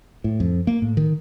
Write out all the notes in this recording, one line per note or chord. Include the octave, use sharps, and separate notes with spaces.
A2
F2
A#3
A2
D#3